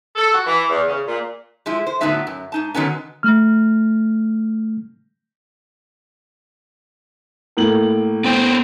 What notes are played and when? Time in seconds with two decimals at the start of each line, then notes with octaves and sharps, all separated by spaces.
0.16 A4
0.33 F#4
0.46 E3
0.69 E2
0.87 C#3
1.07 A#2
1.66 F3 G#3 E4
1.86 C5
2.01 A2 D3 F#3 B3 D#4 E5
2.27 F#2
2.52 G#2 D#4 A5
2.74 D3 D#3 F#3 B3 C#4
3.23 A3 F6
7.57 A2 A#3 F#7
8.24 B3 C5 G5